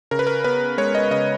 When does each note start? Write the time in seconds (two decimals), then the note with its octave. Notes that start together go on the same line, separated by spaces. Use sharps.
0.11 C#3 A#4
0.19 B4
0.27 A#4
0.44 B3 B4
0.78 G#3 C#5
0.95 D#5
1.11 C#3 D#5